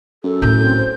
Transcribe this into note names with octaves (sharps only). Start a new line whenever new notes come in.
F#2 A4
A2 E4 G6
C4
C5